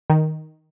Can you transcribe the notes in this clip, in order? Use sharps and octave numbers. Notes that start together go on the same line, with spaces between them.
D#3